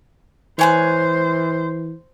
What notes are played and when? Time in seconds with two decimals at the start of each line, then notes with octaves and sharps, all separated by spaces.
0.59 E3 C5 C#5 G#5 F#6